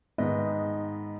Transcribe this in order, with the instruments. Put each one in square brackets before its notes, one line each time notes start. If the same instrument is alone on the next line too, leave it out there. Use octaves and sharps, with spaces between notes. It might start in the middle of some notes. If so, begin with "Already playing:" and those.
[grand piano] G#2 D#3 B3 D#5